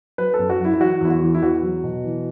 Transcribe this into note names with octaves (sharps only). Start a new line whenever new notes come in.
F#3 B4
F#2 A4
F#4
F#3 E4
E4
E3 F#4
E2 E4
F#4
E3
E4
E2 F#4
F#3
B2
E3